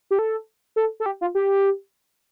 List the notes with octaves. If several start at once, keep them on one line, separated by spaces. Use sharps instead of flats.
G4
A4
A4
A4
G4
F4
G4